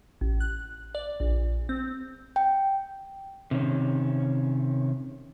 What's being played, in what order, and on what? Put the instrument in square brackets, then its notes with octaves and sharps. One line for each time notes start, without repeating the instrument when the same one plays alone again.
[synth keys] A1
F#6
D5
A#1
C4
[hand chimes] G5
[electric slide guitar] C3 D#3 C#4